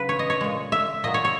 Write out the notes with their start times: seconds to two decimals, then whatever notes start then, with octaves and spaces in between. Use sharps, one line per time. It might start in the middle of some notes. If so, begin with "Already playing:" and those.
Already playing: C#3 F#3 B4
0.09 C#5
0.19 D#5
0.30 C#5
0.41 A#2 G#3
0.72 E5
1.04 A#2 F#3 D#5
1.14 C#5
1.25 C#5